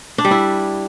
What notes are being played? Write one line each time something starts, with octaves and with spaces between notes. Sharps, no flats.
D4
G3
E4